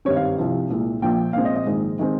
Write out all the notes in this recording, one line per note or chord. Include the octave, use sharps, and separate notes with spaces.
G#1 G2 G3 C4 C#5
F5
C2 C3 F3
C2 A#2 G#3
A#1 A#2 F3 G5
A#1 A#2 G#3 C4 F5
D#5
D#5
A#1 G#2 D#3 G#3
D#3 G#3 C4